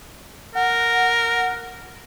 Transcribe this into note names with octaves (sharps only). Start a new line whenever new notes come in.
A#4 F#5